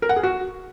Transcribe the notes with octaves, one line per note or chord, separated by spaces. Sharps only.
A#4
F#5
G#4
F#4